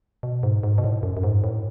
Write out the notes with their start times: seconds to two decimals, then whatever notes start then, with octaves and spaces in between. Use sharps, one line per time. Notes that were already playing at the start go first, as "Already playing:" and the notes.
0.23 B2
0.43 G#2
0.63 G#2
0.78 B2
0.84 A2
1.03 F#2
1.17 F#2
1.23 G#2
1.44 A2